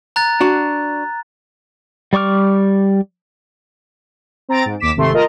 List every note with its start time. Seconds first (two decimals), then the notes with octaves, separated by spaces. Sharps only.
0.16 A#5 F#6 A6
0.41 D4 F#4
2.13 G3 D5 C#6 D6 F6
4.49 C4 A#5 A6 D7
4.65 G#2
4.80 D#2 D6 B6 E7
4.96 G#1 C3 A3 C6
5.14 F4 A#4 D#5 A5 A#5